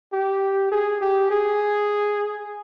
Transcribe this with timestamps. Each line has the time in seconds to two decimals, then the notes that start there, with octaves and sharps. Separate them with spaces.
0.13 G4
0.71 G#4
1.01 G4
1.31 G#4